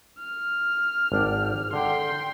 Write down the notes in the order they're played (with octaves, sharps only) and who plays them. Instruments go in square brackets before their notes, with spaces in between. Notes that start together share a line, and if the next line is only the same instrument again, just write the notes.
[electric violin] F6
[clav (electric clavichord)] G#1 D4 G5
[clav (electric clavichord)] D3 [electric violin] G5 C6